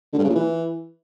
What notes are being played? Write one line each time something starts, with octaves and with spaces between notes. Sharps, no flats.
D3
G2
C#3
A#2
E3